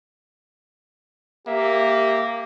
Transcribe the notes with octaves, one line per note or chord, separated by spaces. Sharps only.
A#3 G4 E5